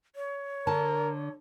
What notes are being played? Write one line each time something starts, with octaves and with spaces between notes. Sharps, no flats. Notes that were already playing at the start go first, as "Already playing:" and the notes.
C#5
D3 A#4 A5